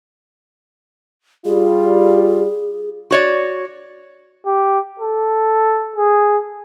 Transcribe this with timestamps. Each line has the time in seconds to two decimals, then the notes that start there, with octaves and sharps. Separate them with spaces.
1.45 G3 F4 G#4
3.11 F#4 C#5 D5
4.46 G4
4.99 A4
5.96 G#4